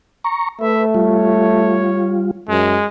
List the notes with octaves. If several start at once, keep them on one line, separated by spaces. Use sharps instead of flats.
A#5 C#6
A3 B4 E5
G3 F4 C#5
F#2 G#3